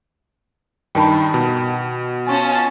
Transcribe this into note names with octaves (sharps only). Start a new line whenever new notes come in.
G2 D#3 D#4 G5 A5 B5
B2
C#4 F4 G#5 A5 C#6